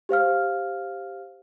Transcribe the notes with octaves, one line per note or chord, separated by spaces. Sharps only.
G4 C5 F5 F6